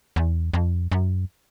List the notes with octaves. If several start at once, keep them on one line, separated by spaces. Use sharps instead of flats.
E2
F2
F#2